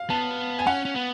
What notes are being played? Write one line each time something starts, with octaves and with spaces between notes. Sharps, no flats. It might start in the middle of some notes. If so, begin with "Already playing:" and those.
Already playing: F5
B3 A5
G#5
C#4 F#5
C#4
B3